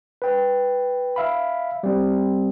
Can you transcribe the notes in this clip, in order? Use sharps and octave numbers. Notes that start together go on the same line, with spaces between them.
B4 G5
E5 F5 B5
G3 C4